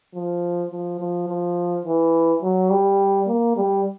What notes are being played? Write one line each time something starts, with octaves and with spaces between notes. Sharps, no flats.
F3
F3
F3
F3
E3
F#3
G3
A#3
G3